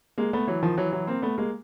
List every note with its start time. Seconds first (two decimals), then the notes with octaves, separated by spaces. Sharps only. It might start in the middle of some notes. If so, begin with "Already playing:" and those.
0.18 G#3 A#3
0.33 A3 B3
0.47 E3 F#3
0.62 D#3 F3
0.77 E3 F#3
0.92 E3 F#3
1.07 A#3 C4
1.22 A3 B3
1.38 G#3 A#3